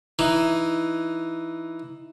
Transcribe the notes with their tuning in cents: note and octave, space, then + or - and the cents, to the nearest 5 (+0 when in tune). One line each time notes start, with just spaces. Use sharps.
E3 +0 D#4 +0